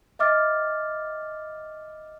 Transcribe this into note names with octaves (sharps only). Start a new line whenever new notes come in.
D#5 E5 D6 F6 A6